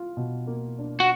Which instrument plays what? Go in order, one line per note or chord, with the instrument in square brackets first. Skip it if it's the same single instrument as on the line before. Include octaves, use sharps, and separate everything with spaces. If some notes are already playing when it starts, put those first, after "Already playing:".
Already playing: [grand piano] F4
B2
A#3
D4
[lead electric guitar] F#4